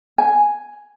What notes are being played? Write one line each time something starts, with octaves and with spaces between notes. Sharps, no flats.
G#5